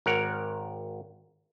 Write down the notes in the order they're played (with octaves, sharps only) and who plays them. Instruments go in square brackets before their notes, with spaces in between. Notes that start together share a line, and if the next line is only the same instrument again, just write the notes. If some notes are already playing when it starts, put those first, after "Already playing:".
[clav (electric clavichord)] G#1 A#4 C#5 F#5